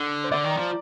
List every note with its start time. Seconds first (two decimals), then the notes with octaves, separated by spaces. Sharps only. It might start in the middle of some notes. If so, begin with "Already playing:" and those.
Already playing: D3
0.24 C5
0.31 D3 D5
0.44 D#3
0.50 A#5
0.57 F3